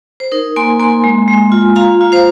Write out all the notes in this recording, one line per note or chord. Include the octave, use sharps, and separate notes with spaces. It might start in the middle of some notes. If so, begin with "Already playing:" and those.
C5
D#4 A#4
A#3 G#5 C6
A#3 G#5 C6
G#3
G#3
F4
F4 F5 A#5
F4
C5 F5